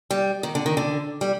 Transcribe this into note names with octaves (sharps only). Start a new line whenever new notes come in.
G3
D#3
D3
D#3
D3
G3